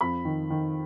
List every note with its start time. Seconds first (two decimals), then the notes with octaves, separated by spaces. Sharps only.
0.01 F2 B5
0.25 D#3
0.50 D#3